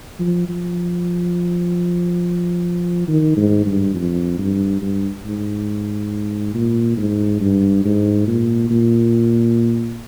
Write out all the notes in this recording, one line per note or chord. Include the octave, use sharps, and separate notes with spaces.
F3
F3
D#3
G#2
G2
F2
G2
G2
G#2
A#2
G#2
G2
G#2
A#2
A#2